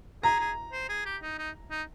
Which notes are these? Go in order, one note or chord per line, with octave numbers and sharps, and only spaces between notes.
G#4 A#5
G#4
C5
G#4
G4
D#4
D#4
D#4